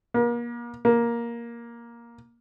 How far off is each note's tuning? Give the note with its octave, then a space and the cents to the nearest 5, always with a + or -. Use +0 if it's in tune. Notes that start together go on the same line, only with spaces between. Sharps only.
A#3 +35
A#3 +10